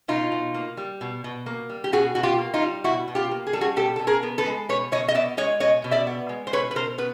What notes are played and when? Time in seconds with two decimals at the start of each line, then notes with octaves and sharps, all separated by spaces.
0.08 B2 D#4 F4
0.32 B2
0.54 A#3
0.77 G3
1.01 B2
1.24 B2
1.46 A#3
1.69 G3
1.84 G4
1.92 B2 F#4 G#4
2.15 B2 F#4
2.23 F4 G4
2.38 A#3
2.54 D#4 F4
2.62 G3
2.84 B2 E4 F#4
3.08 B2
3.15 F4 G4
3.31 A#3
3.47 G#4
3.53 G3 A4
3.61 F#4 G#4
3.76 B2 G4 A4
3.96 B2 A4
4.07 G#4 A#4
4.23 B3
4.38 A4 B4
4.46 G#3
4.69 B2 B4 C#5
4.92 B2 C#5 D#5
5.08 D#5
5.14 B3 D5 E5
5.37 G#3 C#5 D#5
5.60 B2 C#5 D#5
5.84 B2
5.91 D5 E5
6.07 B3
6.29 G#3
6.47 C5
6.52 B2 B4 C#5
6.71 B4
6.76 B2 A#4 C5
6.98 B3 B4